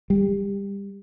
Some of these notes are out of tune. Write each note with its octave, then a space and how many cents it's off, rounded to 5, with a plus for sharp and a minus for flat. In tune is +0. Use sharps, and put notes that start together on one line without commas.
G3 +25